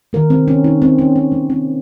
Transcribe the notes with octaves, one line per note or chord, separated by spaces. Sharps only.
D#3 A#3 A#4
C4
C#4
D#4
C4
C#4
C4
A#3
C4